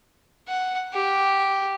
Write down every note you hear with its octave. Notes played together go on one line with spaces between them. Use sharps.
F#5
G4